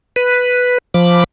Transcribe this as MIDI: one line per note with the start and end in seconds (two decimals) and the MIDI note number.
0.16 0.78 71
0.94 1.24 53
0.94 1.24 83
0.94 1.24 86